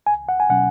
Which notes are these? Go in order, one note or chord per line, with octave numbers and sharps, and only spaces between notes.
C#2 G#5
F#5
G#5
B2 F#3 C#4 F#5